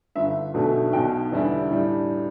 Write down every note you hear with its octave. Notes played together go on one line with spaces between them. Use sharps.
G1 G2 D3 E5
B1 B2 A3 D4
B1 B2 B3 G5
E2 D3 G3 E4
A2 G3 D4